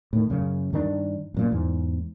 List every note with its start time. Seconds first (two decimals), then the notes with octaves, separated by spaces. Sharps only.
0.13 A2 D#3
0.30 F#2 C#3
0.73 G2 D#3 D4
1.34 E1 F#2 A#2
1.51 E2 G#2